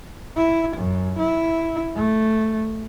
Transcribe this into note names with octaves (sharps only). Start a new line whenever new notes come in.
E4
F#2
E4
A3